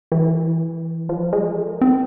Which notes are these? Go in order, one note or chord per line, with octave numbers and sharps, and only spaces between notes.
E3
F3
G#3
A3
A#3
C4